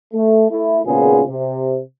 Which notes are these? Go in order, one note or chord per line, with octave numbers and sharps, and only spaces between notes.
A3
A3 E4
G#1 A#2 C#3 B3 F4 G#4
C3